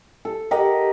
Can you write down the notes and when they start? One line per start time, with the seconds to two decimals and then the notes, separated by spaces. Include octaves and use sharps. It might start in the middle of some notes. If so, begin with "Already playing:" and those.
0.25 A4
0.51 G4 A#4 D#5 F#5